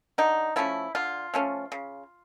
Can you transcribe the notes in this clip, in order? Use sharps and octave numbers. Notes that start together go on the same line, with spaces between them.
D3 D#4
F3 A3 C#4 E4
D3 F4
F3 A3 C#4
C#3